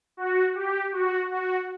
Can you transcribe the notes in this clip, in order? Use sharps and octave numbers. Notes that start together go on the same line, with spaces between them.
F#4
G4
F#4
F#4